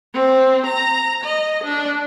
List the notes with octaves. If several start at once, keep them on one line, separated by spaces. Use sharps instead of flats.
C4
A#5
D#5
D4